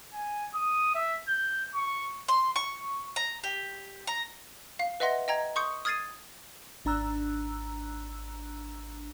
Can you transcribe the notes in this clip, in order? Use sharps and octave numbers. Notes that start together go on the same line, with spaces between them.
G#5
D#6
E5
G6
C#6
C6
C#6
A#5
G4
A#5
F5 C7
B4 D#5 E5 F#5 C6 A#6
D#5 G5 A#5 G#6
C6 C#6 D#6 G6 C#7
D#6 F6 G#6 A6 C7 D#7
G#1 D4 A#5 E6 F#6